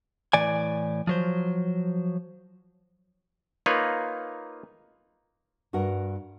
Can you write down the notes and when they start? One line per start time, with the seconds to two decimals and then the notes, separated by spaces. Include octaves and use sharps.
0.33 A2 E3 D5 G#5
1.07 F3 F#3 C5
3.66 A#3 D#4 F4 B4 C#5
5.73 G2 F#4 A#4 F#5